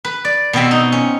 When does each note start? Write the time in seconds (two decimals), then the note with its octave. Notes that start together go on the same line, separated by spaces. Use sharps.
0.05 B4
0.25 D5
0.53 B2 B3 C4 E5
0.71 D#4
0.92 C#4